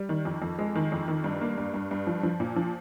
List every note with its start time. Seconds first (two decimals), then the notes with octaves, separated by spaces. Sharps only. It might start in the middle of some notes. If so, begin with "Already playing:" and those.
Already playing: G3
0.09 D#3
0.25 F2
0.42 F2
0.59 G#3
0.75 D#3
0.92 F2
1.08 D#3
1.24 G2
1.41 A#3
1.58 G2
1.74 G2
1.91 G2
2.07 F3
2.23 F3
2.40 A#2
2.56 F3